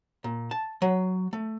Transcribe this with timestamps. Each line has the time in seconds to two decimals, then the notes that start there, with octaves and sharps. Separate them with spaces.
0.24 A#2
0.51 A5
0.82 F#3
1.33 A3